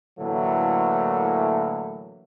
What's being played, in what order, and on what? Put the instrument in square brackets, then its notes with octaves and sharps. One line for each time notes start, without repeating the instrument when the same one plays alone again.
[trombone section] A2 D3 E3 F#3 A3 A#3